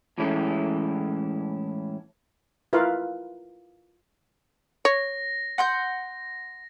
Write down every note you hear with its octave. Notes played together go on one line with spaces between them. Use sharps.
A2 E3 G#3 C#4 E4 A4
E4 F4 A#4 B4 F5
C#5 A#6
F#5 C6 G6